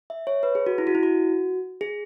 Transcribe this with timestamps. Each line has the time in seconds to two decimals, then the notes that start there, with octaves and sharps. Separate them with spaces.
0.10 E5
0.27 C#5
0.43 B4
0.55 G#4
0.66 F#4
0.78 E4
0.87 F#4
0.95 E4
1.03 F#4
1.81 G#4